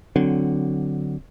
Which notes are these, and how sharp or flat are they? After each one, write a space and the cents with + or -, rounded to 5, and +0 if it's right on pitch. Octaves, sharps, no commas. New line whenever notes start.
D3 +0 F#3 +0 C4 -10